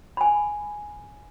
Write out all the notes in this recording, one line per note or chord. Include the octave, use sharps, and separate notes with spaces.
G#5 B5